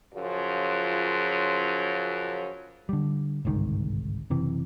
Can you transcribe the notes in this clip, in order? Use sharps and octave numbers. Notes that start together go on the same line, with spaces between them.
F#2 C#3 F3 F4
D3 G3
G1 C2 G#2 D#3
F#1 C3 E3